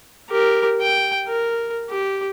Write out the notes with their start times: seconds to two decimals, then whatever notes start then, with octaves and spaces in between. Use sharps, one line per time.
0.30 G4 A#4
0.82 G5
1.28 A#4
1.90 G4